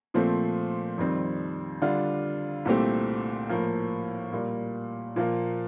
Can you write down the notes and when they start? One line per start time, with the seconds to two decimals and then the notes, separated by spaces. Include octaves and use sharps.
0.14 A#2 F3 A3 C4
0.98 F2 D#3 G3 C4
1.82 D3 G3 D4 F4
2.65 C2 A#2 A3 C4 G4
3.49 A2 F3 A#3
4.32 A#2 G3 A#3
5.16 A#2 F3 A#3